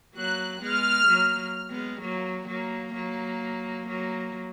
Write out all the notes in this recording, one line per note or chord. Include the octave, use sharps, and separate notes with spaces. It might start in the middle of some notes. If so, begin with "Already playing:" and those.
F#3 A#3 F#6
G#3 B3 F6
F#3 A#3
G#3 B3
F#3 A#3
F#3 A#3
F#3 A#3
F#3 A#3